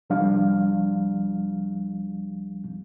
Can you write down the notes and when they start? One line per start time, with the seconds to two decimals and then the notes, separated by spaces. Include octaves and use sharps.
0.10 C2 F3 G3 D4 G4 F5